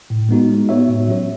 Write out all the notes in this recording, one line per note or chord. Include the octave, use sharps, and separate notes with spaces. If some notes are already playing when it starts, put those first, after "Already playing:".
A2
G#3 B3 D#4 F#4
G#3
B3 F#4 C#5 E5
A2
F#3 C#4 F#4 C#5